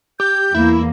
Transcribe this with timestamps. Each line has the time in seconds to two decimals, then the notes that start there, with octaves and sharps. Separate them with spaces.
0.20 G4 G6
0.54 E2 A#3 E4